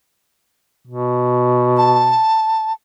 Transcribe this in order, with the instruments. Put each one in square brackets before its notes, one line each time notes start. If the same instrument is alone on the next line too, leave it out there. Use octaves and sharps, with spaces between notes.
[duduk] B2
[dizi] A5